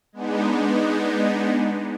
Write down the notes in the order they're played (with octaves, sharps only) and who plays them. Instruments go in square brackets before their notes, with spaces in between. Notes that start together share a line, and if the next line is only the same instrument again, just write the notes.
[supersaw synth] G#3 B3 D4 D#4